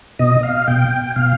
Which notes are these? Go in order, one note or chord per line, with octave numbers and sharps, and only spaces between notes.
B2 D#5
F5
B2 G5
B2 F5